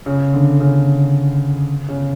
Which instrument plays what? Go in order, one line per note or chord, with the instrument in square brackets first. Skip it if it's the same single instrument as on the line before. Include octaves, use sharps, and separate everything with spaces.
[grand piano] C#3
D3
C#3
C#3